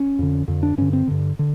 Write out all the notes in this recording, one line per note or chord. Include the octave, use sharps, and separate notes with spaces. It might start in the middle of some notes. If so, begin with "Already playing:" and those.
Already playing: C#4
F2 D3
F2 D3
D4
G2 D3 C#4
C4
G2 D3
D3